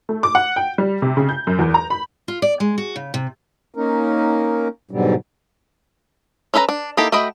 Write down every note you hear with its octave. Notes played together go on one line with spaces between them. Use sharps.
A3
D6
F#5
G5
G3
C3
C#3
G6
F#2
E2
A#5
B5
F4
D5
G#3
F#4
C#3
C3
A#3 C#4 D#4 A#4
G#2 B2 D3 F#3 G3
C#4 A4 B4 E5 A#5
D4
A#3 D#4 E4 G4 A4
A3 F#4 D#5 G5 B5